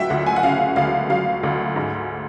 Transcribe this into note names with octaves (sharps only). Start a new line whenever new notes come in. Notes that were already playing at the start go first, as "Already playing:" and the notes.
Already playing: D2 F#3 E5 F#5 G5
D2 F#5
G#5
F#5
C#3 F5
D2 F5
F#3 F5
D2
G#2